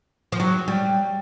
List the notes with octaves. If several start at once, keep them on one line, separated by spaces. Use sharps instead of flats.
F3
F#3
G3